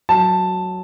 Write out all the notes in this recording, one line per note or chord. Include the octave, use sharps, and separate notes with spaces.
F#3 A5